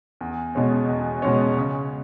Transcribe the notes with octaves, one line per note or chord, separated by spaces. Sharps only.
E2
B2 G#3 C#4
E2
B2 G#3 C#4
C#3